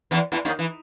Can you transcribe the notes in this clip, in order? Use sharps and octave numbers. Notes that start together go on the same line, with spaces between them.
E2 E3
E2 E3
D#2 D#3
E3